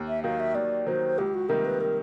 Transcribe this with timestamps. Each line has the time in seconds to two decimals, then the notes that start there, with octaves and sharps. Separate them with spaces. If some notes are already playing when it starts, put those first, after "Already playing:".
Already playing: D#2
0.08 E5
0.23 D#3 F#3 F5
0.40 E5
0.55 D#2 D5
0.86 D#3 F#3 C5
1.18 C#2 G4
1.34 F#4
1.49 C3 D#3 G3 A#3 A#4
1.65 B4
1.81 A#4